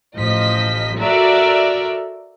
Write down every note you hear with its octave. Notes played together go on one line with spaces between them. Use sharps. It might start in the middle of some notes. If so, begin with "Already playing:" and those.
A1 F3 D#5 B6
F#4 A4 A#4 D5 E5